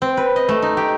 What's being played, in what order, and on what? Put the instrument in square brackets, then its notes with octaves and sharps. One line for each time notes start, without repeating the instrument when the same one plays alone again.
[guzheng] C4
B4
D#5
A3
D#4
G4